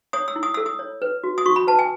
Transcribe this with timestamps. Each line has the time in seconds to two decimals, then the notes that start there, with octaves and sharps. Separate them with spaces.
0.13 C#5 D#6
0.28 E6
0.36 E4
0.43 D#6
0.54 A4 E6
0.66 D#6
0.79 C#5
1.02 B4
1.24 F#4
1.38 D#6
1.46 F#4 C#6
1.56 B5
1.67 B4 A5
1.79 G#5